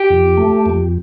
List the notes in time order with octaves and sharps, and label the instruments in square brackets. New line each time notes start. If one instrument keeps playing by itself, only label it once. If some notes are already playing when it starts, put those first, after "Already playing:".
Already playing: [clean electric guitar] G4
[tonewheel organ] F2
A3
F2